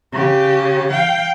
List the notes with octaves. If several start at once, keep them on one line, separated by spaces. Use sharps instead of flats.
C#3 G4
F5 G5